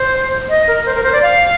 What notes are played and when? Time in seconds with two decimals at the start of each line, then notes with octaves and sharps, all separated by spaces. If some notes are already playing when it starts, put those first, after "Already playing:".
Already playing: C5
0.49 D#5
0.67 A#4
0.86 C5
0.95 A#4
1.04 C5
1.12 D5
1.23 F5